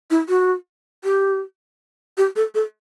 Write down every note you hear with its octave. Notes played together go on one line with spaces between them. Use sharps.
E4
F#4
G4
G4
A4
A4